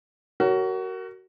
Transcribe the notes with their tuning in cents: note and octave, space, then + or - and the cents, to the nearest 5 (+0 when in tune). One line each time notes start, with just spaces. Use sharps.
F#4 +25 A#4 -10 C#5 +0